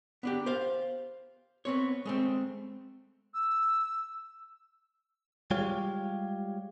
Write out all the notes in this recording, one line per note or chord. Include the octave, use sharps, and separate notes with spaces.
B3 D4 G4
C5 F5
B3 C4 C#5
G#3 A3 C4
E6
G3 G#3 F4 G4 C#5 F5